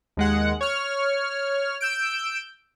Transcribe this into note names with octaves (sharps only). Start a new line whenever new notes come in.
D#2 G#3 F#5
C#5 F6
E6 G6 D7